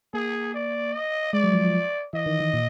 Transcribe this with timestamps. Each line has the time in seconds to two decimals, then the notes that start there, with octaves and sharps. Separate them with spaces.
0.14 A#3 G#4
0.54 D5
0.93 D#5
1.33 G#3 D5
1.44 F#3
1.53 F3
1.64 F3
2.13 E3 D#5
2.26 D#3
2.40 D#3
2.53 A#2